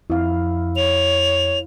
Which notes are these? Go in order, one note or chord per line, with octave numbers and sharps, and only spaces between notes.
F2 E4 F5
C#5 F7